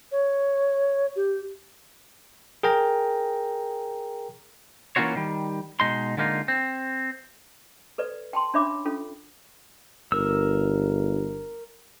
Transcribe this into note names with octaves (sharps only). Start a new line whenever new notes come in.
C#5
G4
G#4 A#4 G5 A#5
E3 A#3 C#4 F4 F#4 C#5
D#3 G3
B2 G#3 D#4 C6
D3 G#3 A#3 D#4 F4
C4
A4 B4 D5
G5 A5 C6
C#4 D4 C#5 E5 B5 D6
C#4 F4 A4
G1 A#4 E6